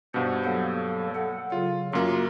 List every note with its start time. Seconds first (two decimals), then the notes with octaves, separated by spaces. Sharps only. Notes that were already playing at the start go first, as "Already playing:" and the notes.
0.14 G2 B2 C5 F#5
0.44 F#3 A#3 A4
1.15 A4 F#5
1.52 C#3 F#3 F4
1.93 F#2 A#3 F4 F#4